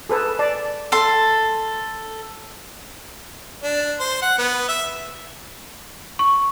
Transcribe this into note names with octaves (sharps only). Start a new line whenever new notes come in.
G#4 A4 B4
D5 A5
A4 C6
D4
C5
F#5
B3
E5
C#6